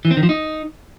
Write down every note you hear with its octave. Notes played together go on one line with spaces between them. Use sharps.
E3
C4
D#3
F3
D#4